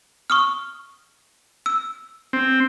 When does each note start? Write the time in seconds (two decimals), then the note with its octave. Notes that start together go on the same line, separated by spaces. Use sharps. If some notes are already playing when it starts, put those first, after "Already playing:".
0.30 C#6 D#6 F6
1.66 E6
2.33 C4